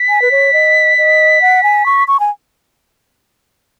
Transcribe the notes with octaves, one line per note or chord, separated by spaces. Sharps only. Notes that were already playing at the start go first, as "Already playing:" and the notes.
Already playing: B6
G#5
B4
C#5
D#5
D#5
F#5
G#5
C#6
C#6
G#5